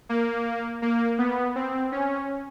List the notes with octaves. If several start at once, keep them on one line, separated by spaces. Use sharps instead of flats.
A#3
A#3
B3
C4
C#4